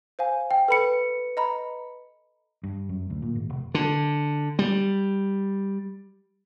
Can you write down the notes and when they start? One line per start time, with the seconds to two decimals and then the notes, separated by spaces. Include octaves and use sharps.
0.19 C5 F5 G#5
0.51 G5
0.68 A4 B4 B5 C#7
1.37 D#5 A#5 B5
2.63 G2
2.89 F#2
3.10 D2
3.22 A#2
3.35 G#1
3.50 F1
3.74 D3
4.59 G3